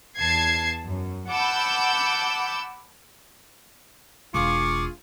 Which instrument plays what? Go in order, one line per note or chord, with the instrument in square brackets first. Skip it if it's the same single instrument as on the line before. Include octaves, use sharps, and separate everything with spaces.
[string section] E2 A5 G#6 C7
F#2
F#5 A5 B5 D6 E6 G6
[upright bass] E1 [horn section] F4 G#4 [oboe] C#6 [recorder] D6